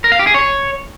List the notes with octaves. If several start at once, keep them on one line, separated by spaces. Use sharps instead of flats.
A#4
F5
G4
G#4
C#5